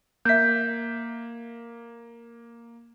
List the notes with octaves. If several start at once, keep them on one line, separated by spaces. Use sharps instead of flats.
A#3 E5 G6 B6